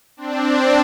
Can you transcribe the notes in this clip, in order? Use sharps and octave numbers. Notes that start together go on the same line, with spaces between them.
C4 D4